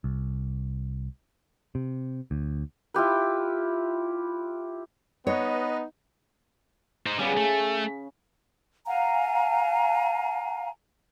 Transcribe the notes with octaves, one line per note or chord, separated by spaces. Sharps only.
C2
C3
D2
E4 F4 G4 B4
B3 D#4 B4 C#5 D#5
D#4 C5
C#3 G3 B3
A3
F5 F#5 G#5 A#5